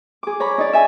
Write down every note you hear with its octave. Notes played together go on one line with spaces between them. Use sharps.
G#4 D6
C#5 A#5 B5
D#4 D5
E5 G#5